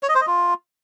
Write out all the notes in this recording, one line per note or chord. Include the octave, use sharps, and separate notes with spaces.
C#5
D#5
C5
D#5
F4